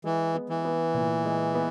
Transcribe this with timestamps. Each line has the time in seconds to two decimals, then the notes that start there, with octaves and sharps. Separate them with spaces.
0.04 E3 G#3
0.34 B3
0.49 E3
0.65 B3
0.94 A#2
1.25 G#3
1.55 B3